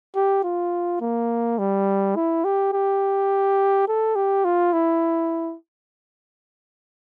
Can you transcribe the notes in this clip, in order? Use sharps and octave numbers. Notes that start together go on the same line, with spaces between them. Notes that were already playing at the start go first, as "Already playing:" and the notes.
G4
F4
A#3
G3
E4
G4
G4
A4
G4
F4
E4